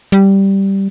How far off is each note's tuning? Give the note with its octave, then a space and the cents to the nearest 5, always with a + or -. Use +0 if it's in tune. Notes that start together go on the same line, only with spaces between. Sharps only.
G3 -5